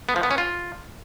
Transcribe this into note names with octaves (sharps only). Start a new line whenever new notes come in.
B3
F3
B3
C#4
F4